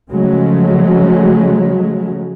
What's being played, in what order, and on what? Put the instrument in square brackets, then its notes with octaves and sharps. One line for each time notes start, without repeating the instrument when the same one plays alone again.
[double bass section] C#3 F3 F#3 G#3 A3